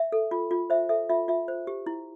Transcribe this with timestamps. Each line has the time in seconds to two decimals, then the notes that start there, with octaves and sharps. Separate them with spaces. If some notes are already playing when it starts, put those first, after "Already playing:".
Already playing: E5
0.12 A4
0.31 F4
0.51 F4
0.70 C5 E5
0.89 A4 E5
1.09 F4 E5
1.28 F4 E5
1.48 C5
1.67 G4
1.86 E4